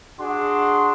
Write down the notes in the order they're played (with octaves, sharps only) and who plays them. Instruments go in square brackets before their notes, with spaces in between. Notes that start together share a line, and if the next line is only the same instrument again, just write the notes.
[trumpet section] D4 F#4 G#4 C6